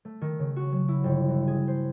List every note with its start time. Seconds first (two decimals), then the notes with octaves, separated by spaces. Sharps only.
0.05 A3
0.21 D#3
0.39 C#3
0.56 F#4
0.72 F#3
0.88 E4
1.04 G1
1.28 E3
1.48 G#4
1.68 C5